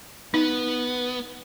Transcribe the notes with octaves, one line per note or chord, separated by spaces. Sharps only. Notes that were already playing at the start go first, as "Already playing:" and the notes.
B3 D#4